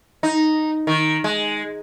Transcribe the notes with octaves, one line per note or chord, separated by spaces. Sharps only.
D#4
D#3
G#3